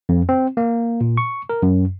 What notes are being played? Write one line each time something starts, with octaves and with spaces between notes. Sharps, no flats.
F2
C4
A#3
A#2
C#6
A#4
F#2